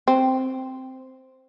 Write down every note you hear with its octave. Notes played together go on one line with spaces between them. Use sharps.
C4